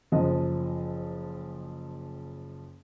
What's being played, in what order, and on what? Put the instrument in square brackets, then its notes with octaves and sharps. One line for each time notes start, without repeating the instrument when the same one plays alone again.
[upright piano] F#1 F3 D#5